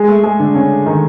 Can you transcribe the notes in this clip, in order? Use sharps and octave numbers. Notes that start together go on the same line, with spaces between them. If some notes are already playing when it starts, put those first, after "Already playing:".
Already playing: G#3 G#4
A3 A4
G#3 G#4
D3 D4
C#3 C#4
D#3 D#4